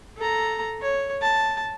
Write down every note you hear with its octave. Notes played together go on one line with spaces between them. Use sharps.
A4 A#5
C#5
A5